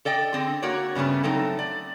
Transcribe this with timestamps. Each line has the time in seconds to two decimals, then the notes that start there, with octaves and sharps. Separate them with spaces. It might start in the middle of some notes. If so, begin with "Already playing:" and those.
0.05 A4 D5 D#5 G5
0.33 D3 C4 G#4
0.62 A#3 F#4 A#4 C#5 D5
0.95 G2 C#3 A3 B3 C#4
1.23 F#3 A3 C4 D#4 A4
1.59 D5